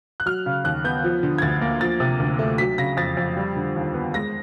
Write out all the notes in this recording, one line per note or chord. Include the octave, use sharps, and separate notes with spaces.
F#6
F#3 F6
C#3
D#2 F#6
B3 G6
F3
D3
G#6
D2 A6
A#3
F3 A6
C3
D2
A3
F#3 B6
C#3 A#6
F2 A6
F2
G3
D3
D#2
B3
G#3 A#6